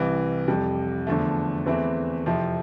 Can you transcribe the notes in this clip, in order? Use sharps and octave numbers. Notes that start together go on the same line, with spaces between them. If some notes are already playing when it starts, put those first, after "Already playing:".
Already playing: C2 C3 E3
F2 C3 G3
E2 D3 F3 A3
E2 E3 A3 C4 E4
F2 C3 F3 C4 E4